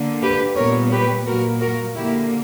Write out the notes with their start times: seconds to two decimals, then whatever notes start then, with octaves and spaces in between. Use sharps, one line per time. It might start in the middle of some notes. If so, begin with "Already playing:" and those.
Already playing: D3 A#3
0.22 G4 B4
0.57 A#2 G3 B3 A#4 C#5
0.92 G4 B4
1.26 A#2 F#3 A#3 F#4 A#4
1.61 F#4 A#4
1.95 D3 A#3 E4 G4